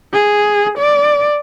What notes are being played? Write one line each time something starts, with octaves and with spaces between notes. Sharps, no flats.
G#4
D5